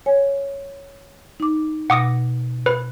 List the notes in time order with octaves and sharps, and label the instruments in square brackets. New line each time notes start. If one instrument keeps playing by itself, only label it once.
[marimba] C#5 G#5
D#4 D6
[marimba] B2 A#6 [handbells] F#5 D6 D#6
[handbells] B4